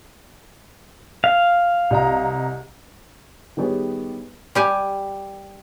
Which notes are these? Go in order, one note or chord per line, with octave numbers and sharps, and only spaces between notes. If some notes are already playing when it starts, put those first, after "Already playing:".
F5
C2 D#5 A#5
D#3 G3 B3 G4 G#4 C#5
G3 G4 G#5